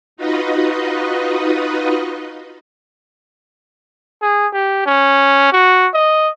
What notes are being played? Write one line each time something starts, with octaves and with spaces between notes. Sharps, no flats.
D#4 F4 F#4 B4 D#5
G#4
G4
C#4
F#4
D#5